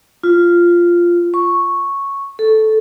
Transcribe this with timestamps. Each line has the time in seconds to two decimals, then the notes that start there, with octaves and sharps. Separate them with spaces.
0.23 F4
1.34 C#6
2.39 A4